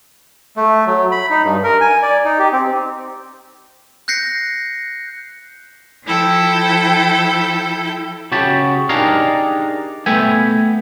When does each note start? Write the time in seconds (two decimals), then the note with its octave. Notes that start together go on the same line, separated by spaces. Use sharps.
0.57 A3
0.87 F#3
1.12 B5
1.30 D#4
1.44 G2
1.64 A#4
1.81 G#5
2.03 D5
2.25 D#4
2.39 G4
2.52 C4
4.08 F#6 G6 A#6 C7 C#7
6.05 F3 E4 A4 G5
8.32 C#3 F#4 G4 A5
8.89 D4 D#4 G4 G#4 A#4 F5
10.06 A3 B3 E5 G5 G#5